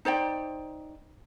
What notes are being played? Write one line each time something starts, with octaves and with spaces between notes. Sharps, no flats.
D#4 C5 D5 G5